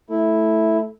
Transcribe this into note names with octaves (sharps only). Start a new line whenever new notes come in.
A3 E4